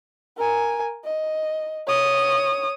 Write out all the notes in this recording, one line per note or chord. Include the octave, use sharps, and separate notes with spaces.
A#4 G#5
D#5
C#5 D#6